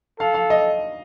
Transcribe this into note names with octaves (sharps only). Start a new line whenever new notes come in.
A4 F5
F5
D#5